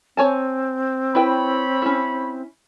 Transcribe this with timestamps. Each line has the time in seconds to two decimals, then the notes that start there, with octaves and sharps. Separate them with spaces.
0.17 C4 C#5 G#5 A5
1.15 E4 B4 C#5 G5 B5
1.82 C#4 E4